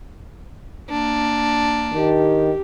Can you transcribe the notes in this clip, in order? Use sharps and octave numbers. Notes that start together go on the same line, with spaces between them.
A#3 D4
D#3 G4